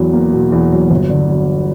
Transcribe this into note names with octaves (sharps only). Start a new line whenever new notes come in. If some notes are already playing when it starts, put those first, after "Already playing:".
Already playing: E2 F#3
A#3
B2
E2
F#3
G1
D3
F#3